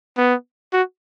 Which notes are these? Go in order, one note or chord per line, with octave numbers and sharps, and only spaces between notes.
B3
F#4